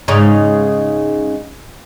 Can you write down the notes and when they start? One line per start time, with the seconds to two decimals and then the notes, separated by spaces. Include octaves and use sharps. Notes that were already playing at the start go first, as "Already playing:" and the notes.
0.08 G#2 C#3 D#4